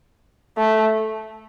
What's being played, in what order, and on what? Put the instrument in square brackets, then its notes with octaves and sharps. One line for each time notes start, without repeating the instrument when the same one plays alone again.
[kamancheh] A3